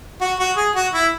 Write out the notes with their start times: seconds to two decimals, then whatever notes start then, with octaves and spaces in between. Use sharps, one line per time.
0.21 F#4
0.39 F#4
0.57 G#4
0.75 F#4
0.93 E4